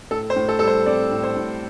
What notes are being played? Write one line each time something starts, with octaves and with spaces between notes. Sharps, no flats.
A2 A4
C5
A2
A4
G3 A4
C5
C4 D5
A2
C5
A2